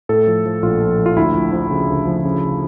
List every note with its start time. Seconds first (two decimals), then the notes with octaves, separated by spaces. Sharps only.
0.09 A2 A4
0.27 F3
0.45 F3
0.63 A#1 F4
0.81 F3
0.99 F3
1.06 F4
1.16 D2 E4
1.35 F3
1.53 F3
1.71 C#3
1.89 D2
2.07 F3
2.24 C#3